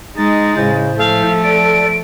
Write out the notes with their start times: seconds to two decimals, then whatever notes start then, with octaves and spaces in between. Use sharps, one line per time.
0.17 G#3 D#4 A6
0.57 A2 C#3 C5
0.98 F3 A3 A4 F5
1.43 D5 D7